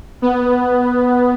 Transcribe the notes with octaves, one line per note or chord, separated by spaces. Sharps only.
B3